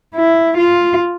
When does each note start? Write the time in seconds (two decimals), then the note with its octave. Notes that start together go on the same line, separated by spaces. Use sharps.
0.15 E4
0.57 F4